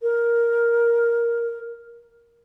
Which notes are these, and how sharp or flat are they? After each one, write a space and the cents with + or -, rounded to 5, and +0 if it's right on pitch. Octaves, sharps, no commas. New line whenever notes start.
A#4 +5